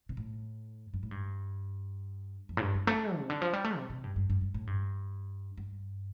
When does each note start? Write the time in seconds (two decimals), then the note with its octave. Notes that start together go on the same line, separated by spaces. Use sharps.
0.09 C3
0.17 A2
0.94 G2
1.03 A2
1.11 G2
2.49 F2
2.57 A2
2.61 G2
2.75 G2
2.87 A3
3.18 C3
3.30 D3
3.42 F3
3.53 G3
3.64 A3
3.77 C3
3.90 C3
4.04 G2
4.16 G2
4.30 G2
4.41 G2
4.54 A2
4.67 G2
5.57 G2